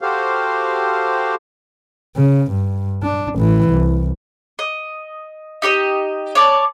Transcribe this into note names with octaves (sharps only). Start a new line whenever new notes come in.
F#4 G4 A4 C5 F5
C#3
G2
D4
A1 E3
C2
D#5
D#4 G4 D5 D#5
C#5 D5 A5